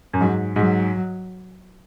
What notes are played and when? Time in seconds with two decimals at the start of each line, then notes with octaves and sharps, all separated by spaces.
0.13 F#2
0.20 G#2 F#3
0.56 G#2 F#3